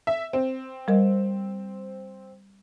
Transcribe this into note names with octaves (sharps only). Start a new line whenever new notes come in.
E5
C4
G3 A#4 D#5